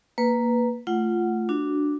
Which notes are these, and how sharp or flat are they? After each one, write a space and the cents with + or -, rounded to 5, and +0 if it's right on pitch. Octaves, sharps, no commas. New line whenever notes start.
A#3 +0 B4 +0
A3 +0 F4 -15 F#5 +0
D4 +0 F#4 +0